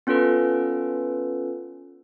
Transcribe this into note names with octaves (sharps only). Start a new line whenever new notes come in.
B3 C#4 F4 A4 B4